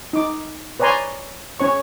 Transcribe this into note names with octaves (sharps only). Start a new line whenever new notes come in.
D#4 D6
B4 C#5 D5 G#5 A#5 C6
C#4 C#5 C#6